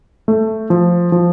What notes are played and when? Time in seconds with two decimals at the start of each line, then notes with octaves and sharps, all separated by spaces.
0.28 A3
0.70 F3
1.12 F3